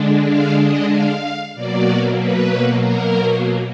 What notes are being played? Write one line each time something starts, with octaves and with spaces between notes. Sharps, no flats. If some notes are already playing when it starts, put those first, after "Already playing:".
Already playing: D3 G#3 D4
F5
D#5
F5
B2 F#3 A#3 D5
B4
A#4